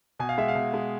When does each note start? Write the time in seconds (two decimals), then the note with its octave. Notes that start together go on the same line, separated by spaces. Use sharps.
0.19 B2 G#5
0.29 F5
0.38 G#3 E5
0.48 F5
0.55 B2
0.74 G#3